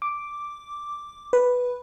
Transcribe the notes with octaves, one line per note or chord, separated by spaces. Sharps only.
D6
B4